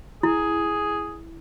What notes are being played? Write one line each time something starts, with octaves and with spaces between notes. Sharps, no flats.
E4 G#4